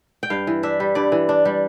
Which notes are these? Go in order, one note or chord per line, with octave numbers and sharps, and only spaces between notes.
G5
G2 F5
E3
D4 E5
G3
G2 D5
E3
D4
G3